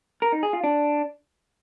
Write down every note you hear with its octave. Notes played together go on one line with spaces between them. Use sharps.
A#4
D#4
G#4
F4
D4